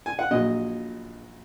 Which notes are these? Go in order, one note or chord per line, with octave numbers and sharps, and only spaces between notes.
G#5
F#5
A#1 A#2 F#3 D#5